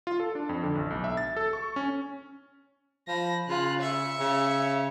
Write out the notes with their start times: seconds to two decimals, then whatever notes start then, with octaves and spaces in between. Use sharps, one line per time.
0.07 F4
0.20 A4
0.35 D4
0.49 F2
0.63 D3
0.75 A1
0.90 B1
1.04 E5
1.17 A6
1.37 A4
1.53 C#6
1.76 C#4
3.08 F3 B5 A#6
3.48 C#3 F4 F#6
3.81 E5 C#7
4.20 C#3